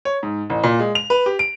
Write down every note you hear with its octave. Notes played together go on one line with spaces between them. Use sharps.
C#5
G#2
A1
A#2
G#3
F7
B4
G4
D7